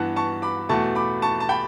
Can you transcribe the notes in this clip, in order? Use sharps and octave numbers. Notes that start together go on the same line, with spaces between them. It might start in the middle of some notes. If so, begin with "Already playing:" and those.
Already playing: G2 E3 B3 F#5 A5
A5 C#6
B5 D6
E2 B2 A3 A5 C#6
B5 D6
A5 C#6
A5
G5 B5